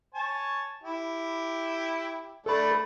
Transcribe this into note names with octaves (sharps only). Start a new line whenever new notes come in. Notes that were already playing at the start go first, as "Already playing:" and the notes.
C#5 G#5 A5
E4 G4
A3 D4 A4 B5